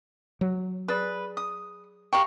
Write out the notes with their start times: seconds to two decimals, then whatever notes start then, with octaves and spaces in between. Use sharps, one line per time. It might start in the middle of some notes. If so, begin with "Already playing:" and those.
0.41 F#3
0.88 G#4 B4 D5 B5
1.37 D#6
2.13 G4 F5 G5 A#5 C#6